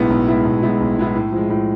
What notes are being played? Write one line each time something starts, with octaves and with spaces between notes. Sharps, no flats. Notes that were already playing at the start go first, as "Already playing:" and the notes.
Already playing: B1 A2 G#3 B3 E4
B1
A2 G#3 B3 E4
B1
A2 G#3 B3 E4
B1
A2 G#3 B3 E4
A2
F3 G#3
A2